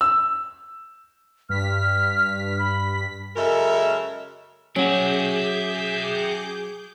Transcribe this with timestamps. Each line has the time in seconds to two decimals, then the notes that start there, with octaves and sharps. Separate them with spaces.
0.01 E6
1.49 G2 F6 B6
2.59 B5
3.36 F#2 C#3 G#3 A4 A#4 E5
4.76 F#3 C#4 F#4 G#4 E5 G5 D6 G6